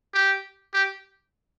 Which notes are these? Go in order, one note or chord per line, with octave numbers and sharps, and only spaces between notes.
G4
G4